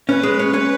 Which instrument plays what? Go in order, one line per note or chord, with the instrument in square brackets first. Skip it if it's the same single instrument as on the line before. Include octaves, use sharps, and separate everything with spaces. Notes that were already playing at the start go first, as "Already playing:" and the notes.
[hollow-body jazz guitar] C#4 [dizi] B4
[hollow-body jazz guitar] G#3
C#4
C#4